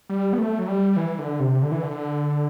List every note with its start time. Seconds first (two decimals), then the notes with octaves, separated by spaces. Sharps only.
0.10 G3
0.33 B3
0.38 A3
0.59 F#3
0.68 G3
0.97 E3
1.19 D3
1.40 C3
1.62 D3
1.72 E3
1.82 D3